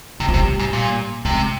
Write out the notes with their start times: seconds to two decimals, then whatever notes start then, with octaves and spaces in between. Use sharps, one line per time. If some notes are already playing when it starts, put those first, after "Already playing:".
0.20 C3 G3
0.29 F3
0.34 C3 G3
0.59 G#2
0.73 A#2
1.25 C3 G#3